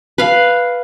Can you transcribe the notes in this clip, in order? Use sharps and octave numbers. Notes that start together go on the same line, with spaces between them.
B4 F5